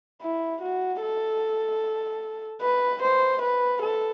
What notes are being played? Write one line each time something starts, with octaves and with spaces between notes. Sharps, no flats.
E4
F#4
A4
B4
C5
B4
A4